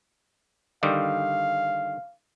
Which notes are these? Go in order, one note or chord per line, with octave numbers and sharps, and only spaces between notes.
D3 D#3 G3 F5